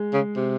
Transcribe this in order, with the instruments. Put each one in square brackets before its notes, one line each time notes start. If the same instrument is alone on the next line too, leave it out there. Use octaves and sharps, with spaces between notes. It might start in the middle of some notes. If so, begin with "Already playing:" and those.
Already playing: [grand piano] G#3
[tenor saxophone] C#3
C3